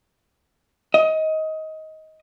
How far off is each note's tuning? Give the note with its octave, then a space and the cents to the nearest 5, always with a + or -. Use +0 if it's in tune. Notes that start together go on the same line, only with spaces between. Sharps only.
D#5 +20